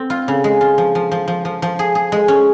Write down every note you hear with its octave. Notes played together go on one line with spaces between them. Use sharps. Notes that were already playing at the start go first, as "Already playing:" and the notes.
Already playing: C4
F4
C#3
G#3
F4
F3
F3
F3
F3
F3
F3
G#4
G#4
G#3
C#4